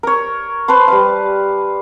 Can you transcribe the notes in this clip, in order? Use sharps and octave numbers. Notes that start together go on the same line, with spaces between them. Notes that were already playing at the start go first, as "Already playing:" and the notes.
A#4 C#5
B4 C5 A5 C6
G3 B4 F5